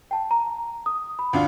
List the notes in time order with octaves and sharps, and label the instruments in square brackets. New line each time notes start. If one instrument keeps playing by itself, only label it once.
[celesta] G5 A5
A#5
D#6
B5
[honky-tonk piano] D2 D4 F4